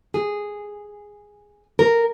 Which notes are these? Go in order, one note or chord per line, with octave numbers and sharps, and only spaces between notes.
G#4
A#4